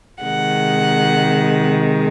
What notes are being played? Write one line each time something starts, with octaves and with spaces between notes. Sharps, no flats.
C3 D#3 G#3 F#5